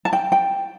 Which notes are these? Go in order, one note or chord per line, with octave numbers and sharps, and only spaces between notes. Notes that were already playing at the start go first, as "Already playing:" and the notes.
A5
G5
G5